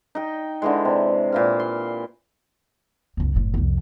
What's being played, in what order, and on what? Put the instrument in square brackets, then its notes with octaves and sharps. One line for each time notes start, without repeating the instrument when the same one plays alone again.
[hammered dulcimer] D#4 G5
D3 E3 G#3
C3
A#2 E3 F5
C6
[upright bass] C#2 F#2
F#1 A2
C2 F2